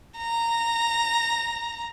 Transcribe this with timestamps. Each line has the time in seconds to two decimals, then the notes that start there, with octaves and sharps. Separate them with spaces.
0.17 A#5